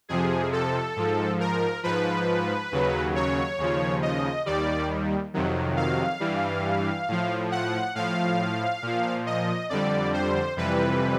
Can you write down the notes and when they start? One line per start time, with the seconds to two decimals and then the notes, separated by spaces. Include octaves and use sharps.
0.09 F2 C3 F3 G#4
0.52 A4
0.96 G#2 F3
1.40 A#4
1.83 G#2 F3 B4
2.72 D#2 C#3 F#3
3.15 C#5
3.58 D#2 C#3 F3
4.02 D#5
4.46 D#2 D#3 G3 D5
5.34 F2 C3 D#3 F#3
5.77 F5
6.20 G2 E3 G3
7.08 A2 F3
7.51 F#5
7.95 A2 F3 F5
8.82 A#2 F3
9.26 D#5
9.69 F2 D3 G3 D5
10.13 C5
10.57 F2 C3 E3 G3 B4